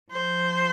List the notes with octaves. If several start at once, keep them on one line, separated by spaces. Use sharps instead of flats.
F3 C5